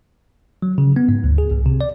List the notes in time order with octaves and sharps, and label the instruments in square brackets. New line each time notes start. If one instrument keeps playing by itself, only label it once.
[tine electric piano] F#3
C#3
B3
G#2
D2
G#4
C2
C3
D5